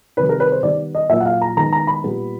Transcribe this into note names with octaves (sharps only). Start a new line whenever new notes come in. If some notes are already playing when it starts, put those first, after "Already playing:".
C3 D#3 G3 B4
A#4
B4
C5
D#3 G3 B3 D5
D#5
A#2 F#3 A#3 E5
F#5
F5
A#5
D#3 G#3 B3 A#5
A#5
B5
A#2 G3 B3